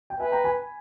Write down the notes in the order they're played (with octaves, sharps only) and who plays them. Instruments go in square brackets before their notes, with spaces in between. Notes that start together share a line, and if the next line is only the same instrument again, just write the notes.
[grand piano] G5
[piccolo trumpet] B4 [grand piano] E5 G#5
[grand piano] G5 A#5
G#5 B5